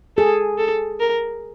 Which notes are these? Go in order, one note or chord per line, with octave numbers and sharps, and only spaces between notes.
G#4 A4
A4
A#4